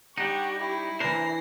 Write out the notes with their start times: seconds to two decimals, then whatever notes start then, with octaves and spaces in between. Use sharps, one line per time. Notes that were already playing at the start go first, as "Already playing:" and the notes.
0.18 G3 D4 D#4 G4 F#5 C#6
0.58 E4
1.00 E3 D4 A#4 C5 A#6 C7